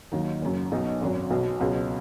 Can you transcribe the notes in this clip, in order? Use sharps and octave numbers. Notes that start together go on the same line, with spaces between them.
D#2 D#3 F#3 D#4
F#1 F#2 F#3
B1 B2 F#3 D#4
G#1 F#2 F#3
B1 B2 F#3
C#2 B2 F#3